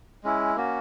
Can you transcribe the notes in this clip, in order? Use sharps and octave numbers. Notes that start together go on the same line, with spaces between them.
G#3 C#4 E4
A#3 C#4 F#4